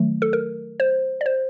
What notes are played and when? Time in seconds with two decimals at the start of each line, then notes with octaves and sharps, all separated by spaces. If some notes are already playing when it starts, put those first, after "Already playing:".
Already playing: D#3 F#3 A3
0.22 A4
0.33 A#4
0.80 C5
1.21 D5
1.26 C5